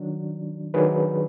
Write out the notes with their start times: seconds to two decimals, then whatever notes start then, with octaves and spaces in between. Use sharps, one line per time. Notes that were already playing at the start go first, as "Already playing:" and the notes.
Already playing: D#3 F#3 D4
0.74 D#3 F#3 D4 G#4 B4